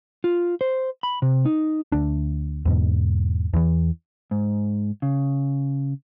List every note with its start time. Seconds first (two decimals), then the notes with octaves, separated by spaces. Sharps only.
0.24 F4
0.61 C5
1.03 B5
1.22 C3
1.46 D#4
1.92 D2 D4
2.65 E2 G#2 B2
3.54 E2 E3
4.31 G#2
5.02 C#3